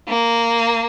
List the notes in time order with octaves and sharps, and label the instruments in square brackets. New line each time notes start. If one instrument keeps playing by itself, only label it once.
[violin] A#3